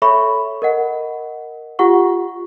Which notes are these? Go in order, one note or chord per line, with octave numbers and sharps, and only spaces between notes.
A4 C#5 E5 B5 C#6
A#4 D#5 F#5
F4 G4 F#5 C#6